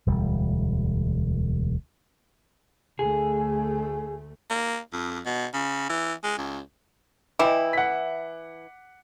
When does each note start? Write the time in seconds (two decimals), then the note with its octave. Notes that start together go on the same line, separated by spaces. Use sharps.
0.07 E1 D2 G3
2.99 D2 A3 G#4
4.50 A#3
4.93 F2
5.26 B2
5.54 C#3
5.89 E3
6.23 G#3
6.38 C#2
7.39 E3 E4 D#5 G5 D6
7.73 F#5 B6